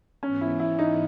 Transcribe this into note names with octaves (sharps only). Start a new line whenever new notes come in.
G#2 E3 B3 C#4
E4
E4
D#4